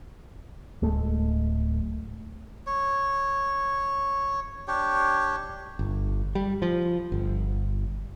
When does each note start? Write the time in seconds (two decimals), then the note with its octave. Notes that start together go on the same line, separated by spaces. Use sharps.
0.82 D1 G#3 A3
2.67 C#5
4.68 D4 G4 C#5
5.79 G1
6.35 G3
6.62 F3
7.12 G1